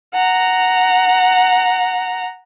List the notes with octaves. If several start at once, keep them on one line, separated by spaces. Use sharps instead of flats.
F#5 A#5